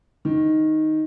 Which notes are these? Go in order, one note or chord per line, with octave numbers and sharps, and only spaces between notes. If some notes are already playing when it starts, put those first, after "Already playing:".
D#3